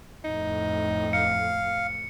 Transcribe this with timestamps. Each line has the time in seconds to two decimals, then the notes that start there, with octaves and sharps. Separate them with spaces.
0.24 F2 A2 D#4
1.13 F5 C#7